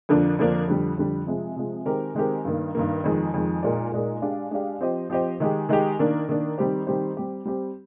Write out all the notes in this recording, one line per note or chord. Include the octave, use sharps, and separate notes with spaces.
F2 D3 F3 A#3 D4
F2 D3 F3 A#3 D4
F2 D3 G3
F2 D3 G3
C3 F3 G#3
C3 F3 G#3
D#3 G#3 C4 G4 A#4
D#3 G#3 C4 G4 A#4
G2 D#3 A#3
G2 D#3 A#3
F2 D#3 G#3
F2 D#3 G#3
A#2 G#3 D#4 A#4 D5
A#2 G#3 D#4 A#4 D5
G#3 D4 G4 D5 F5
G#3 D4 G4 D5 F5
F3 C4 G4 C5 D#5
F3 C4 G4 C5 D#5
D#3 G#3 D#4 G4
D#3 G#3 D#4 G4
D#3 A#3 D4
D#3 A#3 D4
D#3 G3 C4 G4 C5
D#3 G3 C4 G4 C5
G3 C4 G4
G3 C4 G4